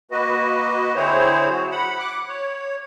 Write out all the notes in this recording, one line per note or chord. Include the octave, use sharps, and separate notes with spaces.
A#3 F#4 B4 D#5
D3 C4 E4 G#4 C5 C#5
F#3 F#4
F#5 B5
D6 F#6
C#5